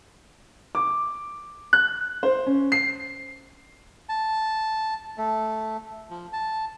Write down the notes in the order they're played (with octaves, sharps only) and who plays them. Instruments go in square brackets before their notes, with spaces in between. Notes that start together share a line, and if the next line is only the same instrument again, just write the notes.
[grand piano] D6
F#6
C5
C#4
C7
[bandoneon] A5
A3
F3
A5